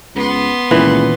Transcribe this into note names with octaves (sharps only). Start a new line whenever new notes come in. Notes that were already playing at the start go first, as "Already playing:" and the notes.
C#2 B3 C6
C#2 A#2 D#3 E3 C#4